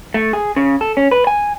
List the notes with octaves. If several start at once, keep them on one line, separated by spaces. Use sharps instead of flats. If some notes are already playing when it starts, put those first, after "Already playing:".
A3
G#4
C#3
A4
C#4
B4
G#5